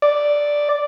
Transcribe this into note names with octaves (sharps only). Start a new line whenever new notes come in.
D5